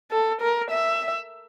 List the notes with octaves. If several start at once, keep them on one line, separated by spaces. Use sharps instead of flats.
A4
A#4
E5